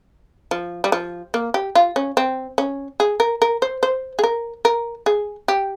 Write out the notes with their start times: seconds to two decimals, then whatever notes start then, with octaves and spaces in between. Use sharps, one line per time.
0.51 F3
0.84 G3
0.92 F3
1.34 A#3
1.54 G4
1.75 F4
1.96 C#4
2.17 C4
2.58 C#4
3.00 G#4
3.20 A#4
3.42 A#4
3.62 C5
3.83 C5
4.19 G#4
4.24 A#4
4.65 A#4
5.06 G#4
5.48 G4